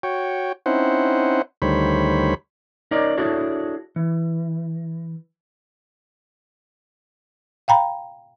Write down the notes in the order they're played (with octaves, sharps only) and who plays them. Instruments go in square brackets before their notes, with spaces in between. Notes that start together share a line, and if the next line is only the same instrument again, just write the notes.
[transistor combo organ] F#4 C#5 G5
C4 C#4 D#4 E4 C5 F#5
D2 D#3 G3 C5 C#5 B5
[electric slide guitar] D#4 A#4 C#5 D5
D4 E4 F#4 G#4 A4 C#5
E3
[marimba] F5 G5 A#5 B5